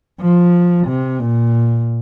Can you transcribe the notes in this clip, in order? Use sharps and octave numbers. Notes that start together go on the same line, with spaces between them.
F3
C3
A#2